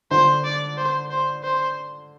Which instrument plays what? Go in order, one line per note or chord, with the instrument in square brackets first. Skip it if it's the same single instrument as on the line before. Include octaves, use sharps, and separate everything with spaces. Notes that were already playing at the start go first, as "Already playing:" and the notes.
[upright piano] D3 [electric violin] C5
[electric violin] D5
C5
C5
C5